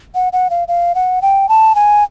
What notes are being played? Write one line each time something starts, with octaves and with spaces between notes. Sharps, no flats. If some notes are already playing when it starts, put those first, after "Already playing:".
F#5
F#5
F5
F5
F#5
G5
A5
G#5